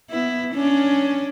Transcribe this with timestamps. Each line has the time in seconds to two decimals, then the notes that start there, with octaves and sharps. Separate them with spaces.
0.10 B3 E4
0.54 C#4 D4